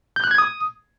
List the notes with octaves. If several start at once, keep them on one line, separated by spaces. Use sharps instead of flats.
G6
F#6
G#6
D#6